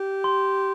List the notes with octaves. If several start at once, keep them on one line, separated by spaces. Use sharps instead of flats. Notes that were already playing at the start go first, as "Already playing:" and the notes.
Already playing: G4
C6